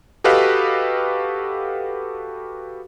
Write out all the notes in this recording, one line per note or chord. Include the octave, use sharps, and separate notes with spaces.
F#4 G4 A4 B4 D#5 F5